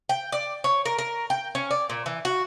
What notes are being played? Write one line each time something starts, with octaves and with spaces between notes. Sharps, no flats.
G5
D5
C#5
A#4
A#4
G5
C#4
D5
A#2
E3
F#4